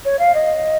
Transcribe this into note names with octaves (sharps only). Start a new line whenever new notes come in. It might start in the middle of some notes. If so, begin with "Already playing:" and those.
C#5
F5
D#5